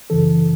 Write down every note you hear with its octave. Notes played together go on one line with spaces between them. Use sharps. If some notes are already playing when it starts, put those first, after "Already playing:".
F#2 C#3 E3 A4